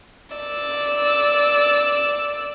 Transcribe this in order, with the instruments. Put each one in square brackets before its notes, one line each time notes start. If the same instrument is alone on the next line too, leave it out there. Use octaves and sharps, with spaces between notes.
[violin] D5 E6